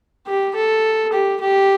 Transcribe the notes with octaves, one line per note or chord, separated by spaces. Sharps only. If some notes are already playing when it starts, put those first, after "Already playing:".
G4
A4
G4
G4